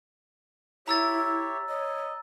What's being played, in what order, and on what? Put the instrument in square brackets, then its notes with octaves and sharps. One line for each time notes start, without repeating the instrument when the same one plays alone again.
[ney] E4 [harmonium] G4 C#5 E5 [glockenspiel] A#5 E6 A6
[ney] C#5 [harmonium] D#5